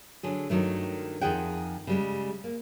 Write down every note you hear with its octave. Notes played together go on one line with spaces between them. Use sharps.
D3 F#3 G#4
G2 D#3 F#3 A3
F2 D#3 F4 G#4 F#5 G5
C#3 G3 G#3
A#3